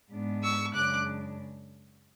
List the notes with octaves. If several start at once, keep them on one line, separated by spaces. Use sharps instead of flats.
G#2 G#3 B3 D4
C#6 E6
F#2 C#3 G#3 D4 D6 F#6